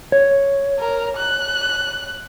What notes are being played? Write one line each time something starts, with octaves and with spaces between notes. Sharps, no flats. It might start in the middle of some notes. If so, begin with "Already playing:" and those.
C#5
A#4
F#6